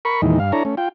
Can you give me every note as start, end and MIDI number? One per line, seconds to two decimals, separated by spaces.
0.05 0.21 70
0.05 0.21 83
0.05 0.21 85
0.22 0.39 40
0.22 0.39 46
0.22 0.39 51
0.22 0.39 52
0.22 0.39 56
0.22 0.39 63
0.40 0.52 43
0.40 0.52 77
0.52 0.63 62
0.52 0.63 64
0.52 0.63 69
0.52 0.63 73
0.52 0.63 82
0.65 0.75 57
0.65 0.75 61
0.77 0.89 65
0.77 0.89 79